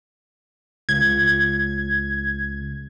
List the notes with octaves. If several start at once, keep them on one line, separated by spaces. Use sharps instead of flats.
C#2 G#6